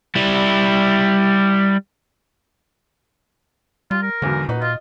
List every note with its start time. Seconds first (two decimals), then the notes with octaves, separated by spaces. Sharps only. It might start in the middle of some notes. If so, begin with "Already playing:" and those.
0.15 G3 E4
3.91 G3 F4
4.03 A#4
4.22 B1 E2 G#2 D3
4.49 A#2 D#4 F#4 B4
4.62 F4 D#5